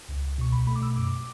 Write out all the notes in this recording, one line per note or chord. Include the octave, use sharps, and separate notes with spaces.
C#2
C#2
B2 C#6
B1 B5
A3 B5
D6
B2 E6
F#2 D6